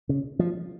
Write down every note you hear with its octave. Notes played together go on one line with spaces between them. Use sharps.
C#3
F3